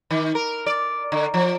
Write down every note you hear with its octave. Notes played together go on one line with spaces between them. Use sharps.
D#3
A#4
D5
D3
F3